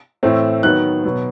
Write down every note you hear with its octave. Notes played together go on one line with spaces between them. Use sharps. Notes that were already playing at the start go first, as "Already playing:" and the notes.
A2 E3 A3 C4
D#3 F#3 B3 F#6
B2 F#3 B3